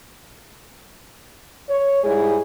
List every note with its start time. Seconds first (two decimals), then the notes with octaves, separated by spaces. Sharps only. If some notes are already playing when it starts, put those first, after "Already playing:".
1.69 C#5
2.04 G#2 G3 G#3 E4 G#4